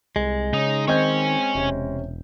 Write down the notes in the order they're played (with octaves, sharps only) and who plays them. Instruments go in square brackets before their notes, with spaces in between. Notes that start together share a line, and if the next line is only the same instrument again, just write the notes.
[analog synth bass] C2 [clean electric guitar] G#3
[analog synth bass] C#3 [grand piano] C#4 [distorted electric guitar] D#4
[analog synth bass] D#3 [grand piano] C4 D#5 G6 [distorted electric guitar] C#5 G#5
[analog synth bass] E1 [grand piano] C3 C#4